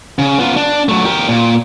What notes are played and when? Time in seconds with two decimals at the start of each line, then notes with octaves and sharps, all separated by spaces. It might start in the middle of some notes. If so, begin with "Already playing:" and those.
0.19 C#3
0.38 B3 F4
0.57 D4
0.89 F#3 A3
1.05 G4 A#4
1.29 A#2